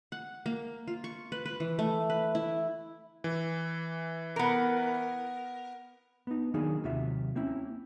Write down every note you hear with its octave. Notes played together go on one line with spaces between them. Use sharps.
F#5
A#3
F4
C#6
B4
B4
E3
A3
B4
E4
E3
B3 A#4
B3 D#4
D#3 F#3 A#3 D4 D#4 G#4
D#2 C3 F#3 F4 E5
A#3 C4 C#4 E4